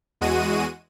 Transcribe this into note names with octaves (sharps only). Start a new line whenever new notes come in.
E2 G#3 F#4 D#7